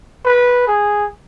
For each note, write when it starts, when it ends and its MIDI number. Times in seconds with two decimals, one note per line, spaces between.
0.25 0.64 71
0.67 1.07 68